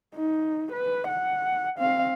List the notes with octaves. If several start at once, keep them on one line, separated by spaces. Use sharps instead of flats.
D#4
B4
F#5
C4 F5